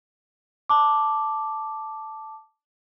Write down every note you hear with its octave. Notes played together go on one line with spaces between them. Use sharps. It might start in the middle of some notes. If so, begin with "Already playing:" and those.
A5 D6